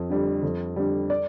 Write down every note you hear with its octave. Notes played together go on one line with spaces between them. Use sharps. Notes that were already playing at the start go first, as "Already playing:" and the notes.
Already playing: F2
D3 G3
F2
D3 G3
D5